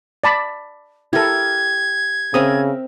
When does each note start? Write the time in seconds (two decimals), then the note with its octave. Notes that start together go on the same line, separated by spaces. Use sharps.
0.24 D5 A5 B5
1.13 E4 G4 A4 A#4 G#6
2.34 C#3 C4 A#4 E5 D#6